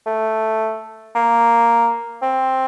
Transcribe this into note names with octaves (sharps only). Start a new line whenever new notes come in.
A3
A#3
C4